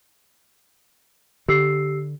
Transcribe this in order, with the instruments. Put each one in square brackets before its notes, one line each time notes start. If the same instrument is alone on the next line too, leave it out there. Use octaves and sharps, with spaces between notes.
[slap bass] D3 [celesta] G4 E6 C7